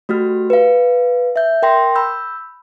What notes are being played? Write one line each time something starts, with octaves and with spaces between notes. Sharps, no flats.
A3 F#4 G4 F6
B4 F5
E5 G6
A#4 G5 C6 A#6
B5 E6 G6